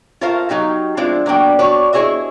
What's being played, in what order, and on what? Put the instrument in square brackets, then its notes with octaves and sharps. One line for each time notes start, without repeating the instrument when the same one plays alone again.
[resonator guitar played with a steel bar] F4 A4 A#4 C5 E5 F5
F#3 D#4 G4 F5
F3 G#3 C4 D4 E4 F4
F#3 A#3 B3 D4 G5
D4 F#4 B4 C#5
E4 G#4 C#5 D#5 E5